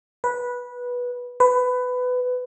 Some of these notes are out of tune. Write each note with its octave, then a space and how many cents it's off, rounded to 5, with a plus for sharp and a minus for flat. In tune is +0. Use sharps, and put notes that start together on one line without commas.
B4 -15
B4 +20